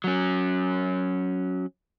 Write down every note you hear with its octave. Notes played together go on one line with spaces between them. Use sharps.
F#3 C#4